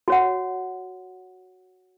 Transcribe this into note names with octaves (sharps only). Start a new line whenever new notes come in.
F#4 C#5 F#5